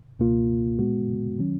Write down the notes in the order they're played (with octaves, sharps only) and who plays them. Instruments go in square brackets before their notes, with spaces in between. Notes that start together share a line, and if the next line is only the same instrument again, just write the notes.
[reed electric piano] C#2 B2 A#3 F4
A#2 G#3 B3 F#4
D#3 F#3 C#4